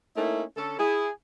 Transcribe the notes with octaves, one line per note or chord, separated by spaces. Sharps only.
A3 A#3 C#4 D#4 E4
D3 C#4 A4
E4 G#4